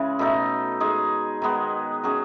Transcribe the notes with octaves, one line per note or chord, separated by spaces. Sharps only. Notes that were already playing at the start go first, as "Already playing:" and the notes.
Already playing: C#3 E3 G#3
B2 A3 D#4 A4
G#3 D#4 G#4
D#3 G#3 B3
F#3 C#4 G#4